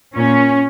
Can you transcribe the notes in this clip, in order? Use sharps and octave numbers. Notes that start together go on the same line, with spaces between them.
A#2 C#4